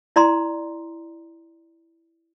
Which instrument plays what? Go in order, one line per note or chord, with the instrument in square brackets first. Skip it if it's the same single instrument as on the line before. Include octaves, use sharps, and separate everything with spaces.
[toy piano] E4 D5 A#5 C6